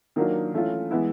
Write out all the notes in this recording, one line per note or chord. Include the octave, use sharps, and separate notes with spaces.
D#3 F#3 A#3 D4 F4
E3 A3 C#4 F4
E3 G#3 B3 E4